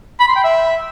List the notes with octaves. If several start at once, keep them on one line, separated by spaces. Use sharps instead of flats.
B5
C6
G5
E5